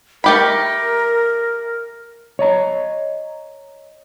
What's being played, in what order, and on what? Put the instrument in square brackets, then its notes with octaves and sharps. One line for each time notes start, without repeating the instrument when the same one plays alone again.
[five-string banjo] A3 G4 B5 [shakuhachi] A#4
[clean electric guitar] C#5 D#5 A#5